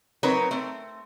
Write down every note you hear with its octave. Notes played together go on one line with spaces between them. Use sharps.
F#3 C4 D#4 A#4 B4 C#5
A3 C4